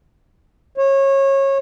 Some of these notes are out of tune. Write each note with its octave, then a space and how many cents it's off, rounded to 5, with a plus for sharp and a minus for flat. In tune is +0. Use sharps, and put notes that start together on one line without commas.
C#5 -25